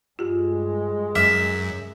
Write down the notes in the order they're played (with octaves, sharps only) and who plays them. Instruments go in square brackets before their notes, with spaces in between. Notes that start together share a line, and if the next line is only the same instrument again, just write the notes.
[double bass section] G2 G#3 [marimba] F4 G4
[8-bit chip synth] F#2 [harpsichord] E5 [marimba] D6 F6